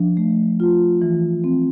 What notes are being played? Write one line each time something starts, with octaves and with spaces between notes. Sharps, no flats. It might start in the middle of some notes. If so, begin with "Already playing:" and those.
Already playing: F3 D4
A3
F4
E3
C4